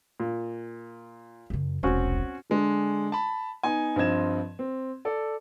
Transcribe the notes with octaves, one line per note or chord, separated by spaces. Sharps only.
A#2
F#2 C#3
E1 C2 C4 C#4 F#4
D3 G#3 D4
A5 B5
B3 D#4 G#5
G2 F3 C4 D#5 G#6 E7
C4
A4 D5